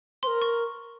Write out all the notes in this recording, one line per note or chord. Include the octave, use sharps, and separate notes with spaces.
A#4 C5 C6
C#6